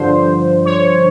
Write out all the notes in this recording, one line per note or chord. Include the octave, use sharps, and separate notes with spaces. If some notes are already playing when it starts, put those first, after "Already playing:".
Already playing: G2 D3 F3 C5
C#5